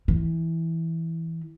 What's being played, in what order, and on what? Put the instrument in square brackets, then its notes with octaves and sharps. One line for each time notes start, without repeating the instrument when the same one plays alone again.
[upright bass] E3